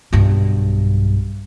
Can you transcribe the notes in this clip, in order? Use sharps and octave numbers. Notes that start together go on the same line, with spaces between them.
B1 G2